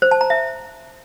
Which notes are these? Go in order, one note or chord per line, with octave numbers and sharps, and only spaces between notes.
C5
A5
A#5
E5